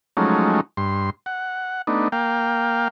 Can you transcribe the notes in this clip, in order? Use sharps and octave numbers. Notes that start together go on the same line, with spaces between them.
F3 F#3 G#3 A3 C#4 D#4
G2 C6
F#5
A3 B3 D4 D#4
A#3 F5 G5